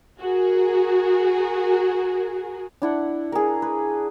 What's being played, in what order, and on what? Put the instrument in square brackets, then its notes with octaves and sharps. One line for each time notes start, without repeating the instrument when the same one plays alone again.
[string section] F#4 G#4 A#4
[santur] D4 E4 F#5
G#4 A#4
B4